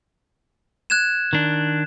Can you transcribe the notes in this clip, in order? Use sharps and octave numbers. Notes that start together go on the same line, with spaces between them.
F#6 G#6 E7
D#3 D4